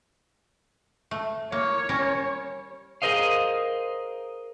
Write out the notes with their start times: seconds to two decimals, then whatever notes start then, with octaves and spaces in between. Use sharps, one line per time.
1.11 A3
1.52 A#3 C#5
1.89 G3 C#4 A#4
3.02 G#4 A#4 C5 D#5 F5